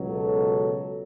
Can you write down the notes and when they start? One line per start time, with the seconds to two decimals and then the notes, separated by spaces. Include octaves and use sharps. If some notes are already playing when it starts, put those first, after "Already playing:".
Already playing: C#2 B2 F#3
0.09 A4